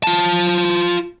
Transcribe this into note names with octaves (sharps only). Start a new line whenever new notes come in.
F4 A5